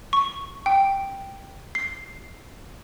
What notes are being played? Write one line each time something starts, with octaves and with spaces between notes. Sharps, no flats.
C#6
G5
C7